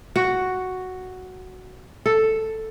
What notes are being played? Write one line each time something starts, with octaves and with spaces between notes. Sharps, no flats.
F#4
A4